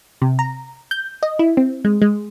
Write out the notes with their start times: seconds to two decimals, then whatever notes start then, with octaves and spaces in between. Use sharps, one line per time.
0.22 C3
0.39 A#5
0.91 G6
1.23 D#5
1.39 E4
1.57 C4
1.85 G#3
2.02 G#3